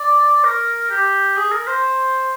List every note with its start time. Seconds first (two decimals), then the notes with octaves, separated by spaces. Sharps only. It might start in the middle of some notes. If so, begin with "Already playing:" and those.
Already playing: D5
0.44 A#4
0.90 G4
1.37 G#4
1.52 A#4
1.67 C5